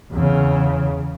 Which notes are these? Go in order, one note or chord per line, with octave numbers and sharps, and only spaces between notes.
E2 C#3